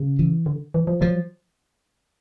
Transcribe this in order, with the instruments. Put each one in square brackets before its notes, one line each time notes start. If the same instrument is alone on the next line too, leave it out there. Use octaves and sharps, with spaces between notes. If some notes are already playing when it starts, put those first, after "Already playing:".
Already playing: [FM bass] C#3
[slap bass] E3
[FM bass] D3
E3
F3
[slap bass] F3 [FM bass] F#3